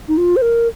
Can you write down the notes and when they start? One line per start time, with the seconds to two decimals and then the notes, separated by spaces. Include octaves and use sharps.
0.08 D#4
0.17 F4
0.36 C5
0.42 A#4